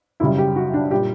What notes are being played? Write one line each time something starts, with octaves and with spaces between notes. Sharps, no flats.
F#2 C#3 G3 E4
G4
F#4
D4
A#2 G3 G4